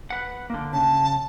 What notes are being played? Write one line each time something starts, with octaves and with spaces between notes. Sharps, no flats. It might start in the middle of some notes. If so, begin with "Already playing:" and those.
B4 F#5
D3 A#3
C#3 A5